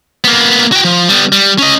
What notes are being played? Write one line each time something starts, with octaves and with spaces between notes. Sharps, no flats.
A#3 B3
F#4 G5
F3
G3 B3
G3
C#4 D#5